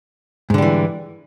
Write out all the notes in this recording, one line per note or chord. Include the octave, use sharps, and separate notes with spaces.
G#2 D3 E3 G3